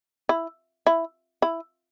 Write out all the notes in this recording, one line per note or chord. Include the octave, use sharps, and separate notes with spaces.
E4
E4
E4